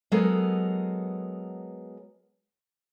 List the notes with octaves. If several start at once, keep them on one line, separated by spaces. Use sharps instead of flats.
F#3 G#3 B3 A4 A#4